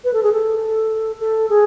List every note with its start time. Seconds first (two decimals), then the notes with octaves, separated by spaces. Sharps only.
0.04 B4
0.14 A4
0.23 G#4
0.32 A4
1.20 A4
1.50 G#4